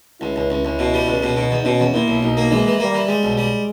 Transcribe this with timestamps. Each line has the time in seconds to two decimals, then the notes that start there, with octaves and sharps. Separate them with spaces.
0.21 C#2 E4
0.36 C#2
0.50 C#2
0.65 C#2
0.79 B2
0.94 G3
1.07 C#2
1.23 B2
1.37 B2 D#4
1.51 E2
1.65 B2 C#4
1.80 E2
1.93 A#2 E4
2.08 B1
2.23 B1 D#4
2.37 A#3
2.51 E3 G#3
2.66 E3
2.80 G3 A#3
2.94 E3
3.08 G3 G#3
3.23 B1
3.38 G3